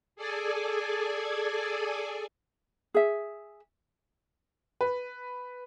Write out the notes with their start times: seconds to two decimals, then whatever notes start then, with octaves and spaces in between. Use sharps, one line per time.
0.16 G#4 A4 D5 G#5
2.94 G#4 E5
4.81 B4